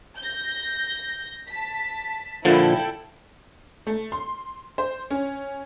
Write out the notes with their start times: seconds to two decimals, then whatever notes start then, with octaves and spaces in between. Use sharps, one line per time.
0.18 G6 A#6
1.50 A5 B6
2.45 A#2 D3 F3 E4 A4 G5
3.87 A3
4.12 C6
4.78 C5
5.11 C#4